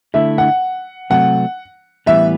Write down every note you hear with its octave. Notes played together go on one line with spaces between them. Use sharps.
D3 A3 E4 E5
F#5
C3 F#3 A3 C4 F#5
A2 E3 G3 B3 E5